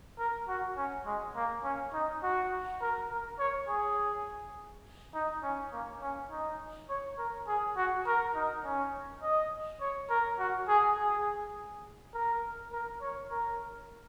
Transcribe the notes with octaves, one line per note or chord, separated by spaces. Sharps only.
A#4
F#4
C#4
G#3
A#3
C#4
D#4
F#4
A#4
A#4
C#5
G#4
D#4
C#4
A#3
C#4
D#4
C#5
A#4
G#4
F#4
A#4
D#4
C#4
D#5
C#5
A#4
F#4
G#4
G#4
A#4
A#4
C#5
A#4